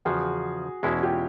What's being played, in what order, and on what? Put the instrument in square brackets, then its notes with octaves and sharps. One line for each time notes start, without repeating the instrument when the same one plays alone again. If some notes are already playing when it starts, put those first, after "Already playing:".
[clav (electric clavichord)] E2 C#3 F3 [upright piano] F#4 G#4
[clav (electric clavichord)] E2 B2 G#3 C#4 E4 [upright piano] F#4 G#4
[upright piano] F4 G4